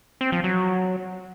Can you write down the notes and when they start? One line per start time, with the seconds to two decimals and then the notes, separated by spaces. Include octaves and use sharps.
0.21 C4
0.32 F3
0.44 F#3